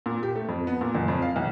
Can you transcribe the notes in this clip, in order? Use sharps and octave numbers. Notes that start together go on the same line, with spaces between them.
A#2
G4
A3
F2
B3
A#2
F#1
F2
F5
B1